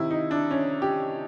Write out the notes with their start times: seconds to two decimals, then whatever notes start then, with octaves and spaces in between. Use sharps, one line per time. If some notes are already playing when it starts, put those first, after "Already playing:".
Already playing: C3 D#3 E4
0.11 D#4
0.31 D4
0.51 C#4
0.82 G4